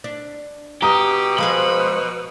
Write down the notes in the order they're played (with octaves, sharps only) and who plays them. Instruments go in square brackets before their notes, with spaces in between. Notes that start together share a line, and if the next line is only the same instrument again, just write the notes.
[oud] D4
[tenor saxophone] B2 [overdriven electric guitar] G4 [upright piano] A#5 D#6
[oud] F3 G#3 G#4 [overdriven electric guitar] B5